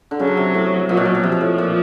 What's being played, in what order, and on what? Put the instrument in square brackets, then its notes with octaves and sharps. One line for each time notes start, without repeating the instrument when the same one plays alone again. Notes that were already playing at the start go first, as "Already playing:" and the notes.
[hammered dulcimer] D3
[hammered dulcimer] C#3 [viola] F#3
[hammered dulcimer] D3
C3
A2
[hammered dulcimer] A#2 [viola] F#3
[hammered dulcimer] B2
A#2
B2
[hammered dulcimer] C3 [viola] F3
[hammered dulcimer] B2
A2
A#2